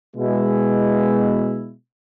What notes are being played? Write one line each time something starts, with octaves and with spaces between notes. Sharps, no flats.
B2 G#3 E4